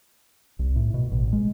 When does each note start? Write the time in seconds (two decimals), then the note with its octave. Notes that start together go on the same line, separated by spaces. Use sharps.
0.59 C2
0.76 A2
0.94 B2
1.12 A1
1.33 G#3